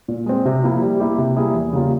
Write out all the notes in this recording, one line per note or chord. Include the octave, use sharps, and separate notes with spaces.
A#2
G#3 C4
C3
F3 A#3 E4
G3
A#3 E4 G4
C3
G3 A#3 E4 G#4
E2
C#3 G3 A#3 F4